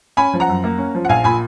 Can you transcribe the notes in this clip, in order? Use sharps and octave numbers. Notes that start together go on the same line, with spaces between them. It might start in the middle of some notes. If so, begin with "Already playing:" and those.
C#4 G#5 B5
F3
F#5 A#5
F#2
A#3
C#4
F3
F#5
A#1 F5 G#5
A#2 G#5 B5